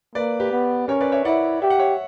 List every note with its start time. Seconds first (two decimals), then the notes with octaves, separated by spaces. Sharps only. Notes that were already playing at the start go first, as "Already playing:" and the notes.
0.15 A#3 B4 D5
0.40 G4 B4
0.51 B3
0.88 C#4 A#4 C#5
1.01 B4 D5
1.12 C#5 E5
1.25 E4 D5 F#5
1.62 G4 E5
1.70 F#5
1.79 C#5 E5